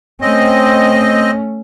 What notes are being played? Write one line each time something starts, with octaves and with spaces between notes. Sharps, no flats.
A3 C4 C#4 D#5